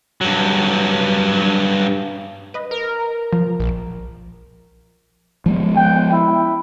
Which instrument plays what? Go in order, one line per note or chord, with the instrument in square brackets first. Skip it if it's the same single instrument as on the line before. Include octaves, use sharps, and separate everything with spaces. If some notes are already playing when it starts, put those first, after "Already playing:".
[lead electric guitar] G2 F#3
[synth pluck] B4 D#5
[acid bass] A#4
[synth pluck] F3
[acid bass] A#1
[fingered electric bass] F3 G#3 B3
[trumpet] G5
E4